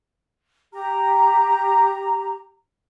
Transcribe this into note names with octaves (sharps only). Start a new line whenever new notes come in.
G4 A#5